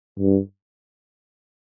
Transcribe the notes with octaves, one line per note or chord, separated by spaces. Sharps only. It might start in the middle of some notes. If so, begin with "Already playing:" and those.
G2